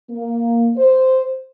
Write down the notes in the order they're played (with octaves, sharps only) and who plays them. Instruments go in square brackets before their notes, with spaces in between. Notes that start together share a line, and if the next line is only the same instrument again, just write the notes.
[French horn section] A#3
C5